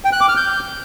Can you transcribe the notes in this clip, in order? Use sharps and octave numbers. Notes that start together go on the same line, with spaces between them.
G5
F#6
D6
F6
G6